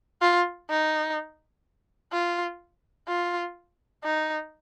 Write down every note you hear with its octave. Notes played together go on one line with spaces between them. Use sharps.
F4
D#4
F4
F4
D#4